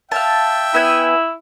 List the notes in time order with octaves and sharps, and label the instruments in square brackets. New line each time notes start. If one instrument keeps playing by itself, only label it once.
[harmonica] E5 G5 [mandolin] F5 A5
[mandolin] B3 G#5 [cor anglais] E4